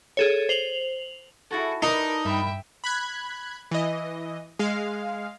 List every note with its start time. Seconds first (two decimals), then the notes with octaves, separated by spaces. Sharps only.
0.17 G#4 A4 C#5
0.49 C5 F7 F#7
1.51 E4 F#4 G#4 A4
1.82 D4 D#4 A#4 B4
2.25 E2 G2 G3 A#4 E5 G5
2.84 B5 F#6 G#6
3.71 E3 D#5
4.59 G#3 F5